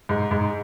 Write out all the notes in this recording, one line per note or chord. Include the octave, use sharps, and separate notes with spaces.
G#2
G#2